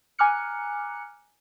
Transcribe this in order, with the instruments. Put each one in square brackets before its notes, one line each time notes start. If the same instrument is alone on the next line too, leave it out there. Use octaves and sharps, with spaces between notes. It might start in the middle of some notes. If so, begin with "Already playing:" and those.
[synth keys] G#5 A#5 D6 F6 F#6 C#7